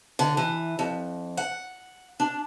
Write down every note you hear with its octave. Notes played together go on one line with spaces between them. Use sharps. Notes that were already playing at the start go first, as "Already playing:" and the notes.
D3
E3
F2
F#5
D4